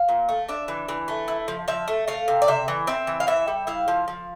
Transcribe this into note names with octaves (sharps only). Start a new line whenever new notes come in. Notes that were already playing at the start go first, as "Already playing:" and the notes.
Already playing: F5
A#2
A3
D4 E5
E3
E3
A3
E4
F3
F3 E5
A3
A3 F5
C3
D5
C3 E5
E3
C4 E5
E3
F5
E3 E5
G3
E4 F5
F3
F3